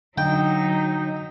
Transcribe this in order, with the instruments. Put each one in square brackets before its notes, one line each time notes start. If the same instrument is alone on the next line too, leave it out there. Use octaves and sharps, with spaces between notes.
[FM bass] D3 [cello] F#3 [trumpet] D#4 [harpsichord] G5